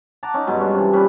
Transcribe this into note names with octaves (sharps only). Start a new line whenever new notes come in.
F#5 A5 A#5 D6
C#4 D#4
G2 B2 F#3 G#3
C#4 D4 F4
C3 E3
A#2 G3 C#4 B4